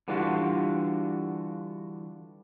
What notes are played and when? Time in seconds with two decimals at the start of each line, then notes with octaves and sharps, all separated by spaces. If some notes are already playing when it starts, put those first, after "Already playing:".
0.08 D3 E3 G3 D4 F4 F#4